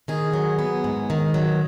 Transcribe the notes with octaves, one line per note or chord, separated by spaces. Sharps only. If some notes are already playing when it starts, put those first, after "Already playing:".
D#3 G#4
F#3
B3
G#2
D#3
F#3